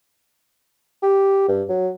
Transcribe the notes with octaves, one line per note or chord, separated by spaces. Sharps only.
G4
G2
F#3